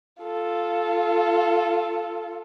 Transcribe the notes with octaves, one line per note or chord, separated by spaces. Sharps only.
F4 A4